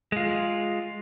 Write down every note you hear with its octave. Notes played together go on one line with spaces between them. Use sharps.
G#3 F4